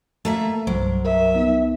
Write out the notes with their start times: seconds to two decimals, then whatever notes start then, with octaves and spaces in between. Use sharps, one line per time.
0.25 A3 A#3 E5 A5
0.67 C2 G2 F#3 C5
1.05 A#4 E5
1.35 B3 D#4